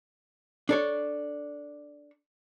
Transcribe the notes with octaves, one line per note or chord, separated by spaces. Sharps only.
D4 A4 C#5